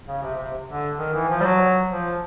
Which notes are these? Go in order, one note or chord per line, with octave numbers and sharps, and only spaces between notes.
C#3
C3
C3
D3
D#3
E3
F3
G3
F#3
F3